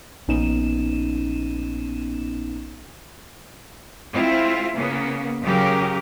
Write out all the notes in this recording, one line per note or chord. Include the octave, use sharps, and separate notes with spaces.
A#1 B3 C#4 D#4 D#7 E7
G#3 C4 E4 F4
C#3 A#3 B3 C#4
C#3 F#3 G4 A#4